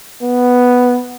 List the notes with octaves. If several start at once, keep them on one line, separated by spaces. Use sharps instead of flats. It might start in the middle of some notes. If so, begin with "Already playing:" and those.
B3